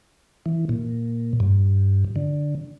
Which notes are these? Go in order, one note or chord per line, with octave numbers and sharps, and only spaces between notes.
E3
A#2
G2
D3